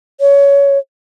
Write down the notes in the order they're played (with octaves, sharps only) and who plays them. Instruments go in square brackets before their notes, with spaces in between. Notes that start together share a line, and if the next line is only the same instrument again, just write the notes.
[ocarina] C#5